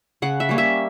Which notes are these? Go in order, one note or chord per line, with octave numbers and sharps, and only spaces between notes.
C#3 F#5
E5
G3 A#3 C#4
E5